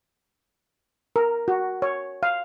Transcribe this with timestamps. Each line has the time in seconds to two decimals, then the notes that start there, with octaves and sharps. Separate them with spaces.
1.16 A#4
1.48 F#4
1.82 C#5
2.23 F5